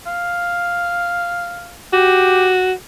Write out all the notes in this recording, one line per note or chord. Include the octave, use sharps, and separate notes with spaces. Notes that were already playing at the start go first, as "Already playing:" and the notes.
F5
F#4 G4